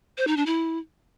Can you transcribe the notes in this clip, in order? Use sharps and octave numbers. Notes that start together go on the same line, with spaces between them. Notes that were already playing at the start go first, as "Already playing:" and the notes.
C5
D#4
D4
E4